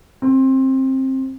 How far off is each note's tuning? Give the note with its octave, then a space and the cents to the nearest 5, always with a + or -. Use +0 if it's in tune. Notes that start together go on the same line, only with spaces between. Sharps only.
C4 +20